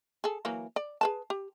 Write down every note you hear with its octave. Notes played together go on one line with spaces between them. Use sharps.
G#4 A4
E3 F#3 A#3
D5
G#4 B4 A5
G4